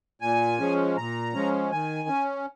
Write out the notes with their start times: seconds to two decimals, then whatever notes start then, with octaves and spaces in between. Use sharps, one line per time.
0.21 A#2 G#5
0.59 F3 G#3 C#4
0.97 A#2 A#5
1.34 F3 G#3 C#4
1.71 D#3 G#5
2.09 C#4